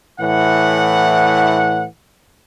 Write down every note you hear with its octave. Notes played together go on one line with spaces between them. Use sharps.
A2 E3 F#5